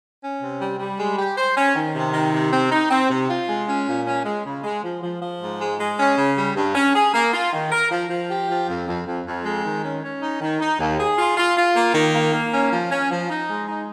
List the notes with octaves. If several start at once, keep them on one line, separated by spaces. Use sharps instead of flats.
C#4
C3
G3
G3
G#3
G4
C5
C#4
D#3
C3
D#3
C3
C4
D#4
C4
C3
F4
G#3
C#4
A#2
C#4
G#3
C#3
G#3
F3
F3
F3
G#2
G#3
G#3
C#4
C#3
G3
G2
C#4
G#4
A#3
F4
D#3
A#4
F3
F3
G4
F3
F2
F2
F2
F2
G#3
D#3
C#4
C#4
D#4
D#3
D#4
D#2
G#4
F4
F4
F4
A#3
D#3
A#3
A#3
C#4
F3
C#4
F3
D#4
G#3
D#4